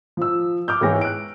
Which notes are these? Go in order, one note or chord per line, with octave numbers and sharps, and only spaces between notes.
F3 E6
D6 F6 G6
G#2 E3 B3 C#5 G5 A#6
F#6 D7